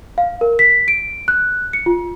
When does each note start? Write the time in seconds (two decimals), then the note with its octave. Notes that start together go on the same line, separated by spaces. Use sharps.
0.18 F5
0.41 A#4
0.59 B6
0.88 D7
1.28 F#6
1.73 C#7
1.86 F4